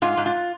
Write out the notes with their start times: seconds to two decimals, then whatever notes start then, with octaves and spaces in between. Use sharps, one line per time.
0.02 G#2 F4
0.17 G#2
0.26 F4